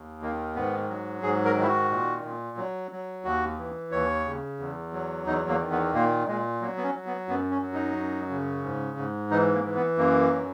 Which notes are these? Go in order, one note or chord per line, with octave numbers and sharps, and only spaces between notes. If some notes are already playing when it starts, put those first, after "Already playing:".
Already playing: D#2
D#3 A#3
G#2 B3
F#3
G#2 G#4
A#4
D#3
E4
F#4
A#2
A#2
F#3
F#3
D#2 F#4
E3
D#2 C#5
C#3
E2
F#3
E2 D#4
A#3
D#3
B3
A#2 A#3
A#2 G#3
F#3 A#3
B3
C#4
F#3
B3
F#2 B3
C#4
F#3
D#4
F#2
C#3
G#2
G#2
E3 D#4
A#3
E3
B3
F#2 A#3
F#3